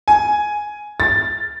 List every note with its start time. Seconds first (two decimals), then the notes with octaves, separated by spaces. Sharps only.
0.08 G#5
1.00 A6